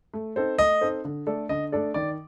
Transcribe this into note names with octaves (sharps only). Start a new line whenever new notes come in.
A3
C4 D#4 A4 C5
A3 D#5
C4 D#4 A4 C5
D3
A3 D4 A4 D5
D3 D#5
A3 D4 A4 D5
D#3 D5